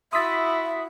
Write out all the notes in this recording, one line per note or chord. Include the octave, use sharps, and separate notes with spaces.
E4 F#4 E5 C6 D#6 E6 A6 B6